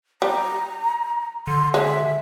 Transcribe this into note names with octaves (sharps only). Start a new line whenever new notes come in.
G3 A#5
D3 C6
G#3 E5